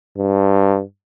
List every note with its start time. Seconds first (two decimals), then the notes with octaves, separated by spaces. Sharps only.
0.18 G2